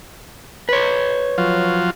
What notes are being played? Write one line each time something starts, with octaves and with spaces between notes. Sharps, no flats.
B4 C#5
F3 F#3 F4